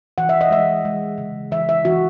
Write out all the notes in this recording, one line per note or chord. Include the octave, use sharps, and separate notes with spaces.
E3 F#5
E5
D#5
G#3 E5
G#3
C#3
E3 E5
E5
E3 F#4